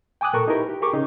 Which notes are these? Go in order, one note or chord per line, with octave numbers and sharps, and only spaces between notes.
G5 G#5 D6 D#6 F#6
A#2 A4 A#4 C#6
D#4 E4 G4 A#4 B4
G4
G4 G#4 A#4 C#6 D6
C#3 C#4 D#4